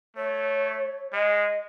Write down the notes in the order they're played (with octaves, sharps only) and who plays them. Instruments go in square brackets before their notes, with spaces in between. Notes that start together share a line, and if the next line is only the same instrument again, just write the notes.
[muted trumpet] A3 [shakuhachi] C#5
[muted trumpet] G#3 [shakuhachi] D#5